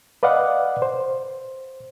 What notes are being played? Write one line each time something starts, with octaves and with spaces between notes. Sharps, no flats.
B4 D5 D#5 F5 F#5
C5